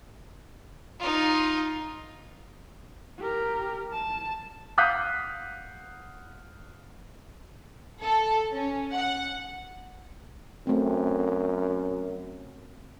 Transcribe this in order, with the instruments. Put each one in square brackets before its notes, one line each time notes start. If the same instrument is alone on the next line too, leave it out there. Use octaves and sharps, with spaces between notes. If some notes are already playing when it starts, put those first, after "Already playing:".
[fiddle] D#4 F4
[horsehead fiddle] G4 A#4
A5
[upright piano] F5 F#5 D#6 F#6 G6 B6
[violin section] A4
C#4
F#5
[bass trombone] F#2 [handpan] A3 C4